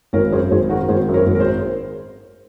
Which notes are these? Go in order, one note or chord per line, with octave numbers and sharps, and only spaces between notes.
G#1 A#4 C#5
F#2 G#4 C5
G#1 G#4 C5
D#3 F#4 A#4
G#1 G#4 C5
F#2
A#4 C#5
G#1
A#4
G#4 C5